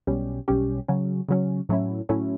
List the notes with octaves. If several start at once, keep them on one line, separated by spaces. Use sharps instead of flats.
B1 B2 G3 C#4 G4
B1 B2 G3 C#4 G4
C#3 F#3 C#4
C#3 F#3 C#4
A2 F#3 A3 C#4 E4
A2 F#3 A3 C#4 E4